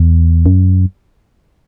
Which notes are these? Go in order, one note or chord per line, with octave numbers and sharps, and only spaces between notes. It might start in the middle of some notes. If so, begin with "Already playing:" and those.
Already playing: E2
F#2